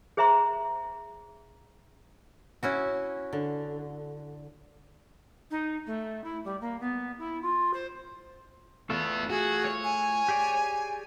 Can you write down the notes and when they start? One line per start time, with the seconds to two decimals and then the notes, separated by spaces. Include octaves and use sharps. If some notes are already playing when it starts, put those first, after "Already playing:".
0.17 G#4 C5 E5 A#5 C6
2.63 C#4 E4 F#4
3.33 D3
5.50 D#4
5.86 A3
6.23 E4
6.44 G3
6.60 A#3
6.80 B3
7.18 E4
7.42 F4
7.73 C5
8.90 A3 B3 E4 F4 A4
9.29 F#4 G#4
9.65 C#5
9.84 G#5
10.28 G4 G#4 D5